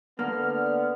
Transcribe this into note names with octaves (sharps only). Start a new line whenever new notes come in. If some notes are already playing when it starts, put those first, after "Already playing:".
D3 A#3 B3 F6